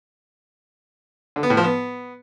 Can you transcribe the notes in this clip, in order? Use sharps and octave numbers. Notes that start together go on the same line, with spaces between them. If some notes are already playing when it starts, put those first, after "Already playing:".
D3
B3
A2
F3
B3